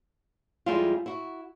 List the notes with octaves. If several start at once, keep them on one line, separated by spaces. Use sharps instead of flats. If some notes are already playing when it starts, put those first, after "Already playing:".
F2 G3 G#3 E4 F4
E4 F#4